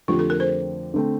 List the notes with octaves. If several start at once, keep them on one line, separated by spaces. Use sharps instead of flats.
F2 D3 A3 C4 F4 G4
A4
A#4
C5
D3 A3 C4